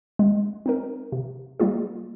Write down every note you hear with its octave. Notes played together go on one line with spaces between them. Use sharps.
G#3
C4 D#4 A#4
C3
G3 A#3 F4 G#4